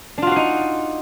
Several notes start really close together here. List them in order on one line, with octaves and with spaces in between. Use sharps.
D4 F4 F#4 F5 D#4